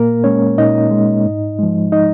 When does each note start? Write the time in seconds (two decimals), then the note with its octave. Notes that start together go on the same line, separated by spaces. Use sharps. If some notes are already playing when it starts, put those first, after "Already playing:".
Already playing: A#2 A#3 A#4
0.24 G#3 C#4 C#5
0.58 A#2 D#4 D#5
0.91 G#3
1.26 G#2
1.59 F3 G#3
1.92 D#4 D#5